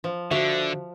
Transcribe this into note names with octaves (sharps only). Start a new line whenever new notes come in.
F3
D3 F#4 E5